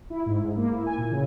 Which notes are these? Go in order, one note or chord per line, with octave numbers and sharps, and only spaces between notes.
E4
G#2
G#2
A#3
E4
G#5
A#2
C#3